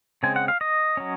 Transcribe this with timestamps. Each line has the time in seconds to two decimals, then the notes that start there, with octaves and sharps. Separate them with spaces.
0.23 C#3 G#3 C4 G#5
0.36 F#5
0.48 F5
0.61 D#5
0.97 F#3 C#4